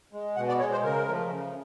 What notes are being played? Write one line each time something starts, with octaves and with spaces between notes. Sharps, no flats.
G#3
B2 F#5
D5
G#3 C#5
C5
C#3 A#4
F3 A3
C#3